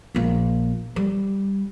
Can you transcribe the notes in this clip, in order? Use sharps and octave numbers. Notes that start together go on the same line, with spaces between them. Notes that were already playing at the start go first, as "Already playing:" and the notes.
A#1 A#3
G3